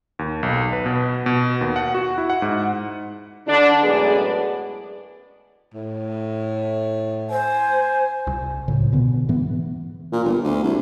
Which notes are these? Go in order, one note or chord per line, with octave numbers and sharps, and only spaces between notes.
D#2
B1
B4
B2
B2
D#2
F#5
F#4
E4
F#5
G#2
D3 D4
F#2 A2 G#3 B3 G#4 D5
A2
C5 G#5
C2
C#2 A2 C#3
B2 D3 B3
G#2 E3 B3
A#2
G1
D2
C2